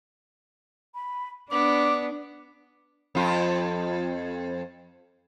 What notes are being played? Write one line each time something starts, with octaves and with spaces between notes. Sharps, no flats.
B5
B3 D4 D6
F2 F4